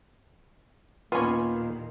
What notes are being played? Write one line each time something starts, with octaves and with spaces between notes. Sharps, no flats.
D#2 A#2 D#3 A#3 B3 C#4 F4